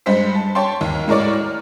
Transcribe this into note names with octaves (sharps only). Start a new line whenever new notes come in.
G2 G3 G#3 C5 B6
A5
C#5 G5 A5 C6
D#2
A2 G#3 A#4 C#5 D5
F6